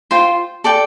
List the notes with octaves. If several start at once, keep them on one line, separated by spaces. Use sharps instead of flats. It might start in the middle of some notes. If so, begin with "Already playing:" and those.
F4 C5 G5 C6
A4 D5 G5